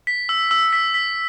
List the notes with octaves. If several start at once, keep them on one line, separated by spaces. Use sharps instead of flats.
B6
E6
E6
B6
B6